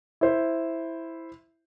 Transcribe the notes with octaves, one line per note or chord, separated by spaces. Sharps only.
E4 C5